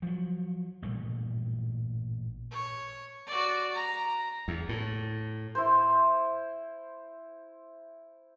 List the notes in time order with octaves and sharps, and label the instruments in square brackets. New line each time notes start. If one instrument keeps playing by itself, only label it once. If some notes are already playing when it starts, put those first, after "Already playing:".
[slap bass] F3 F#3
A1 G2 A#2 G3
[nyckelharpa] C#5
F#4 D5
A#5
[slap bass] E2
A2
[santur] E4 C5